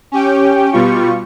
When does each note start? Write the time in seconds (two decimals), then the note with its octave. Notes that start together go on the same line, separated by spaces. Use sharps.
0.12 C#4 G4 G5
0.72 B2 G3 F4 C#6